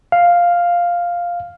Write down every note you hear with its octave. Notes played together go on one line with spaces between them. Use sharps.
F5